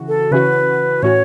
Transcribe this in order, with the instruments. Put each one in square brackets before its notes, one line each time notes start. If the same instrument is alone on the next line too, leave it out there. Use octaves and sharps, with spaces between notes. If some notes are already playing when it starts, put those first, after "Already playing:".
Already playing: [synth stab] C#3 E3 F#4
[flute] A4
[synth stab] C#3 E3 C#4 F#4 [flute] B4
[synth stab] A2 E3 C#4 F#4 [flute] C#5